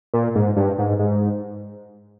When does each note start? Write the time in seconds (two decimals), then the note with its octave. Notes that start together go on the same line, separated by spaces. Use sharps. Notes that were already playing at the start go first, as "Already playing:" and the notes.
0.14 A#2
0.36 G#2
0.57 G2
0.79 G#2
0.99 G#2